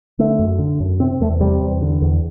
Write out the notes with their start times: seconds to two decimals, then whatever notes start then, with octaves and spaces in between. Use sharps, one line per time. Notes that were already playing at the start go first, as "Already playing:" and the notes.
0.19 D3 A3
0.39 F#2
0.59 D3
0.80 F#2
1.00 C3 C4
1.21 E2 A3
1.40 C3 G3
1.61 E2
1.82 D3
2.02 E2